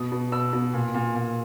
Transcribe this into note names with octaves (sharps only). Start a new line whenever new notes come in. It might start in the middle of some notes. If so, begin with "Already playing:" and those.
Already playing: B2 D#6
B2
B2 E6
B2
A#2
A#2
A#2